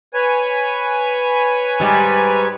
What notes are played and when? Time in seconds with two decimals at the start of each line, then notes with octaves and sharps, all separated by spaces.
0.14 B4 C#5 G#5
1.80 G#2 G3